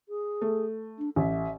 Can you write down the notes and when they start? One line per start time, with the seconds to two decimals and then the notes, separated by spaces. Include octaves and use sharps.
0.09 G#4
0.41 A3
0.99 D4
1.16 A1 E5